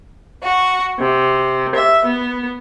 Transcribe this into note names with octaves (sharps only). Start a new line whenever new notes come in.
F#4
C3
E5
B3